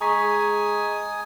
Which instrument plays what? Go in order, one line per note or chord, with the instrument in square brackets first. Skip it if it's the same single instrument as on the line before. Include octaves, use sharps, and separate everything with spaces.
[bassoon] G#3 [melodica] G#5 D#6 [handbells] A#5 C#6 B6